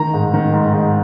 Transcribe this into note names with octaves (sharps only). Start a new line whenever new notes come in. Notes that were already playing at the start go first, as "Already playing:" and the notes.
Already playing: D#3 A#5
G#2
D#3
G#2
G#2